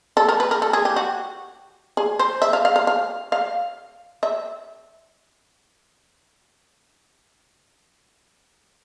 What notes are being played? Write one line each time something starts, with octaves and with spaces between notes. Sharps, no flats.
A4
A#4
B4
A#4
A4
G#4
G4
F#4
G#4
C5
E5
F5
F5
F5
F5
F5
E5